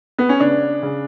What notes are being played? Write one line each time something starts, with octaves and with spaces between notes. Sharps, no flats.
B3
C#4
C#3 D4
C#3